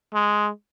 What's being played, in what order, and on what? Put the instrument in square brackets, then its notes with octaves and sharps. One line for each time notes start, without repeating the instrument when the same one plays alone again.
[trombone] G#3